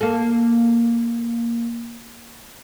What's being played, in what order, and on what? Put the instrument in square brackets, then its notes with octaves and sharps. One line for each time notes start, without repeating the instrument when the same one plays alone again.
[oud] A#3 A4